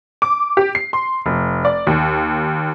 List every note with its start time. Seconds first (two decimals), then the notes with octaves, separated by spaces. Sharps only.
0.22 D6
0.57 G4
0.75 C7
0.93 C6
1.26 F1
1.65 D5
1.87 D#2